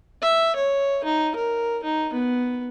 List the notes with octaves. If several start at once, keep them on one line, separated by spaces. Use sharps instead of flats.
E5
C#5
D#4
A#4
D#4
B3